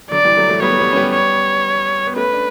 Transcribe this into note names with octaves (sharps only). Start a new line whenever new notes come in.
D3 F#3 D5
E3 G3
F#3 A3
F#3 A3
G3 B3 C#5
A3
G3 B3
C#4
G3 B3
C#5
B3
A3 C#4 B4
D4